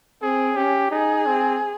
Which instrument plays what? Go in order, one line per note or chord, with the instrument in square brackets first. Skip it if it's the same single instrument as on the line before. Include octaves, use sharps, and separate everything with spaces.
[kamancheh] C4 [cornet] G#4
[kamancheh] C#4 [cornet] G4
[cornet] D#4 [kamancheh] G#4
[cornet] C4